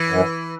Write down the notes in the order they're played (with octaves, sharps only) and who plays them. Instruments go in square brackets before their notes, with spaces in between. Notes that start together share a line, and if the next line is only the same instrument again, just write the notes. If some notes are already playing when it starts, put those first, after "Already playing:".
Already playing: [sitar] E3
[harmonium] F#2